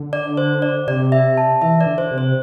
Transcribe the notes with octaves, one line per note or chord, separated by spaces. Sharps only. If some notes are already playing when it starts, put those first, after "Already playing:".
Already playing: D3
D5
C5
D5
C3 D5
E5
A5
E3 E5
D5
D3
C5
C3
C5